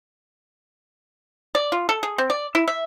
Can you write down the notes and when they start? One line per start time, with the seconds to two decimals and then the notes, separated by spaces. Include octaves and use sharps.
1.55 D5
1.72 F4
1.89 A4
2.03 G#4
2.18 C4
2.30 D5
2.55 E4
2.68 E5